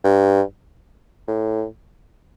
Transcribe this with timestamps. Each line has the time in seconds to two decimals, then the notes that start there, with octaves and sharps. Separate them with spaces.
0.04 G2
1.28 A2